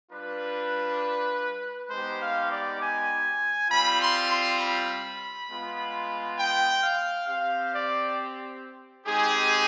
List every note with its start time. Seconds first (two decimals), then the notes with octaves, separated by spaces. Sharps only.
0.11 G3 D4 F4 B4
1.90 G#3 B3 D#4 G4 C5
2.21 F5
2.50 D5
2.80 G#5
3.69 G3 C4 F4 B5
3.99 C6
4.29 C6
4.59 B5
5.48 G#3 B3 F4
6.39 G5
6.83 F5
7.27 C4 G4 F5
7.72 D5
9.06 G#3 C4 D#4 G4 G#4